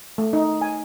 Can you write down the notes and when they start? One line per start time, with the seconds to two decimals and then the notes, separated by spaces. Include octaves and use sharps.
0.18 A3
0.33 D#4
0.61 G#5